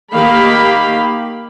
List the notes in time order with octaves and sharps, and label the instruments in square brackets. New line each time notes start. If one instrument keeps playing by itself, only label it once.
[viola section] D#3 A#3 G4 F5 B5